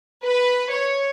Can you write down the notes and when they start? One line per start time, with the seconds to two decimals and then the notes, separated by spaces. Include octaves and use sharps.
0.25 B4
0.71 C#5